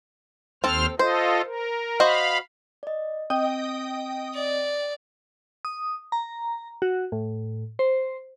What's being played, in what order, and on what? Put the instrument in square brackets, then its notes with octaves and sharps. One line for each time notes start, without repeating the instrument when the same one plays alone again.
[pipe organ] D#2 C5 F6 [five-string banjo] C4 A4
[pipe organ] F4 A4 D#5 [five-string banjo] C5
[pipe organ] A#4
[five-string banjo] F#4 C5 D#5 [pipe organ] F5 B5
[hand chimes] D5 D#5
[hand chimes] C4 [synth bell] D#5 G5 D#6
[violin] D5
[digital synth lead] D#6
A#5
F#4
A2
C5